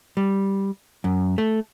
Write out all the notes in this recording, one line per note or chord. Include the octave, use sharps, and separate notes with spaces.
G3
F#2
A3